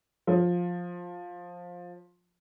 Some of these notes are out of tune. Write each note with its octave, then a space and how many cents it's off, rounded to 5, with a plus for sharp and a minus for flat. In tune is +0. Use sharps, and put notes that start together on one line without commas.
F3 +15